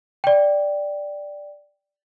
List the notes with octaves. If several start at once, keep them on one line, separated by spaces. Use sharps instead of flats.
D5 G5